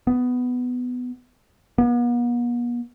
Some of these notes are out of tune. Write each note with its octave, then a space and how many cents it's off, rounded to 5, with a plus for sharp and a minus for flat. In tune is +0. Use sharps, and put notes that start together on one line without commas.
B3 +10
B3 -45